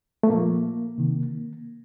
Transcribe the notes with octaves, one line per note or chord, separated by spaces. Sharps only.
A3
A#2 F3 A#3
C3 D#3